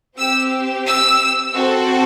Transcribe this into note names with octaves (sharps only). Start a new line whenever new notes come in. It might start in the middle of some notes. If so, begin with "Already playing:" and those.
C4 G4 E6
E6
C4 F#4 A4